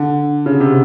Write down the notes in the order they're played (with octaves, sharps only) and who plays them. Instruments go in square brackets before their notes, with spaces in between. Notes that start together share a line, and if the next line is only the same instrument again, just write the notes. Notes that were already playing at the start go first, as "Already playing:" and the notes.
Already playing: [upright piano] D3
C#3
C3